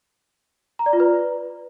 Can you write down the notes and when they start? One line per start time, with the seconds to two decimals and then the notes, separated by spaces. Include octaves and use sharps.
0.79 A#5
0.86 D5
0.93 F4
1.00 B4